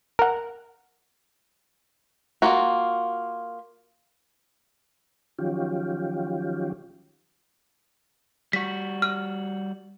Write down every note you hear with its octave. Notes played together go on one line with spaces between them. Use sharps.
A#4 F#5
A#3 F4 F#4
D#3 F3 F#3 C#4 F4 G4
G3 F#4 B6
F6